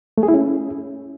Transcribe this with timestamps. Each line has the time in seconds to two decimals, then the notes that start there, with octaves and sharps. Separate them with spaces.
0.18 A3
0.23 G#4
0.28 E4
0.34 C#4